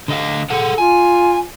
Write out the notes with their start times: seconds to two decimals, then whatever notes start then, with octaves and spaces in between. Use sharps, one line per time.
0.08 D3 D#5 F5
0.50 G#4 A4 F#5
0.78 F4 G#5